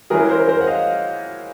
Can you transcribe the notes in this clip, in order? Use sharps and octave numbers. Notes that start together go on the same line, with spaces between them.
E3 G#3 C#4 E4 G#4 A#4
A#4 C5
A#4 C5
F#5
D#5 F5